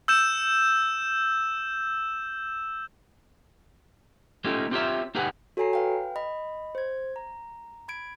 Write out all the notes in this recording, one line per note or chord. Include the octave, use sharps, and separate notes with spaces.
E6 G6 E7
A3 A#3 C#4 D#4 F4 G4
C4 F4 G4 C5 C#5 E5
A#3 D#4 G4 G#4 B4 F#5
F#4 A4 C#5 G#5 A#5 C7
B4 F5 G5
D#5 B5
C5 G#6
A#5
B5 G#6 D7